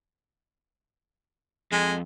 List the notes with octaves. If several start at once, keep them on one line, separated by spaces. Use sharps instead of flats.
F2 G#3